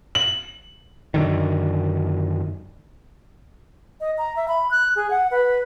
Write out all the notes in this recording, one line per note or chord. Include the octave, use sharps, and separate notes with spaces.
F#7
F#2 D3 D#3
D#5
A#5
E5
B5
F#6
G#4
F#5
B4